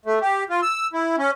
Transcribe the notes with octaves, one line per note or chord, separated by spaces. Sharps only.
A3
G4
F4
E6
E4
C#4